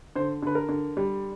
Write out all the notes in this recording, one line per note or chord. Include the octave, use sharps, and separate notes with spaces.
D3 C5
D3 B4
A#4
D3
G3